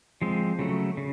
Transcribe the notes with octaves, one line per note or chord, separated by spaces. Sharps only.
F3 G#3 C4
C#3 F#3 A3
C#3